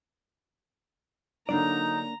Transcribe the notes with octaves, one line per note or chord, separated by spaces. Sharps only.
D3 F#3 A#3 D4 D#4 D5 A#5